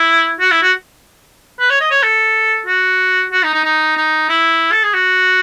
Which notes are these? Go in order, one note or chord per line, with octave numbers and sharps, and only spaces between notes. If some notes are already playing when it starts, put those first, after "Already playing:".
Already playing: E4
F#4
E4
F#4
B4
C#5
D#5
C#5
A4
F#4
F#4
D#4
D#4
D#4
D#4
E4
A4
G#4
F#4